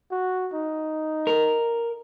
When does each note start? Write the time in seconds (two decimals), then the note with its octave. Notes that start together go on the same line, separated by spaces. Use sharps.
0.11 F#4
0.53 D#4
1.27 A#4